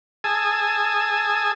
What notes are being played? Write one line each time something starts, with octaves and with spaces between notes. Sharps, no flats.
G#4 G#5 A5 D#6 E6